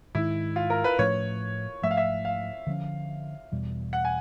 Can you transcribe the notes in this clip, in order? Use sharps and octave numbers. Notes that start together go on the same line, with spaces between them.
G#2 D#3 G#3 E4
F4
A#4
B4
A2 F3 A3 C#4 C#5
G#2 F3 A3 E5
F5
E5
F5
D3 F3 A#3 C#4
E2 B2 G3
F#5
G#5